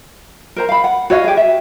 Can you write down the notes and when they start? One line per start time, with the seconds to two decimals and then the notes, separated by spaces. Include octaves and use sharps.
0.56 A#4 C5 A#5
0.69 F5 B5
0.84 F#5
1.10 F#4 C#5 D#5 F5
1.24 G4 G#4
1.37 E5